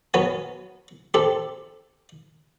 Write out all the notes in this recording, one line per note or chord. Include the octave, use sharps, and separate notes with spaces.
F#3 B3 C#4 B4 C#5
C4 G4 A4